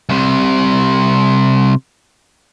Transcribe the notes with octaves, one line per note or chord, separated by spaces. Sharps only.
C2 C3